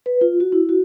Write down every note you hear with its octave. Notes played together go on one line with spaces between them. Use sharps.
B4
F4
F#4
E4
F#4